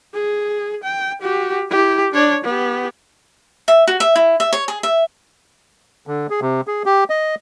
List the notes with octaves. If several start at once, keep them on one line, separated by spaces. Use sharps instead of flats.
G#4
G5
F#4 G4
E4 G4
D4 C#5
B3 G4
E5
F#4
E5
E4
E5
C#5
G#4
E5
D3
G#4
C3
G#4
G4
D#5